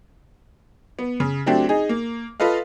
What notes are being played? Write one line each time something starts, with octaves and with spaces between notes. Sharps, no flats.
B3
C#3
F#3 A3 C4 D4 G4
D#4 G#4
A#3
F4 A4 B4 D#5 F5